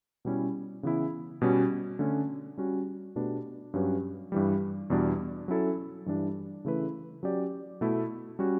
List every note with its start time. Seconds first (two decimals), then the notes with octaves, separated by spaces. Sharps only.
0.25 B2 G3 C#4 E4
0.83 C#3 E3 B3 E4
1.42 B2 G3 C#4 F#4
1.99 D3 A3 C#4
2.58 G3 C#4 F#4
3.16 B2 A3 D4 G4 B4
3.74 G2 F#3 C#4 G4 B4
4.32 G2 E3 G3
4.90 E2 B2 G3 D4
5.48 F#3 C#4 E4 A4
6.06 G2 E3 G3 D4 G4
6.65 C#3 E3 A3 E4 B4
7.23 F#3 C#4 G4 D5
7.81 B2 A3 E4
8.39 G3 C#4 F#4